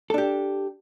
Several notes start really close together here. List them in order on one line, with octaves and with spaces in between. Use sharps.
A4 D4 G4